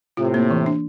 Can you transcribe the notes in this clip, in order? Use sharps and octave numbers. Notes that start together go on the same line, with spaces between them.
A2 C3 F4
A#3
E3
D4